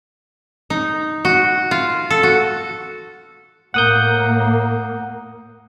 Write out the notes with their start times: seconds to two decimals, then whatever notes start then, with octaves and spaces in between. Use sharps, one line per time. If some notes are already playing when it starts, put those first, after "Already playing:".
0.70 D#4
1.25 F#4
1.71 F4
2.10 A4
2.23 F#4
3.74 A2 A#3 F#5 D#6 G6